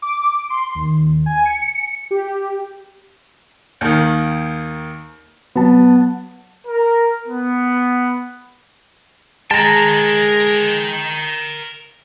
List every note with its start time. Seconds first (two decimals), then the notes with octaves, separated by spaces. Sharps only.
0.02 D6
0.50 C6
0.75 D#2
1.26 G#5
1.45 C#7
2.11 G4
3.81 D#2 D#3
5.56 F#3 B3 A5
6.66 A#4
7.27 B3
9.51 G#3 A#4 G5 A5 A#5